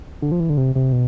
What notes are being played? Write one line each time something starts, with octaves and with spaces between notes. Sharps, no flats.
D3
F3
E3
D3
C3
C3
B2